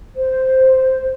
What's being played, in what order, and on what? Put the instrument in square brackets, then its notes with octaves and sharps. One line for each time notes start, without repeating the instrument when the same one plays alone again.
[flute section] C5